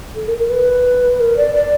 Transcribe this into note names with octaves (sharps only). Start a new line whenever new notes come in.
A4
A#4
A#4
B4
A#4
D5
D5